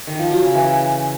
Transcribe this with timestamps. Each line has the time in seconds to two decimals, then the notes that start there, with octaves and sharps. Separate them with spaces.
0.07 D#3
0.19 F3
0.31 F#3
0.43 C#3
0.54 E3